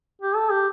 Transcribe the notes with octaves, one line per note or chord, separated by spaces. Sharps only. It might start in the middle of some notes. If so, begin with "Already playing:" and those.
G4
A4
G4